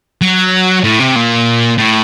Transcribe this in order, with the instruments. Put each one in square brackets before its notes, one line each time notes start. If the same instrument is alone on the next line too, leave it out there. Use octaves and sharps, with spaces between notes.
[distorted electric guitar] F#3
A2
C3
A#2
A2